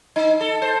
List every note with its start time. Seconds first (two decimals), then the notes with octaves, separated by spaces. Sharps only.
0.16 D#4
0.41 A4
0.62 C5